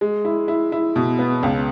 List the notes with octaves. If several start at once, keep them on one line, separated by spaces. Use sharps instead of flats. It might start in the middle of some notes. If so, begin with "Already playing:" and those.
G#3
E4
E4
E4
B2
B3
C#2